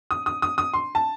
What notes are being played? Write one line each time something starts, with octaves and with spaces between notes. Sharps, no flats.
D#6
D#6
D#6
D#6
C6
A5